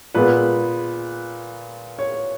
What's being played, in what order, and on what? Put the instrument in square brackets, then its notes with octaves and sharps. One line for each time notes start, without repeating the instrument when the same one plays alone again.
[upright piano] A#2 G#3 B3 B4
C#5